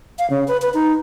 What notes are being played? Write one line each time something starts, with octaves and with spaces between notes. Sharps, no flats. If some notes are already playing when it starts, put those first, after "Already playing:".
F5
C#3
B4
B4
D#4